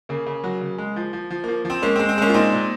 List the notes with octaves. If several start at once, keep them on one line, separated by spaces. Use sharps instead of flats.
C#3 A#3
C#3
F#3
C#3
G#3
F3
F3
F3
F3 A#3
F3 C4
G#3 A#3 C#4
G#3 C4
C4
G#3 A#3 C#4
F4
A#2 C4 D#4
A#2